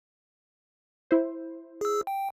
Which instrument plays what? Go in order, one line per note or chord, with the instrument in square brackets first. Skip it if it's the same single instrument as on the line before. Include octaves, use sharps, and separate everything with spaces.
[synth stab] E4 C5
[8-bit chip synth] G#4 E6
G5